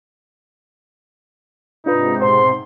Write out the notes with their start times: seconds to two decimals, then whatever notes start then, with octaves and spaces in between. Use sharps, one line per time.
1.86 G#2 C3 D4 D#4 F4 B4
2.22 B2 C5 C6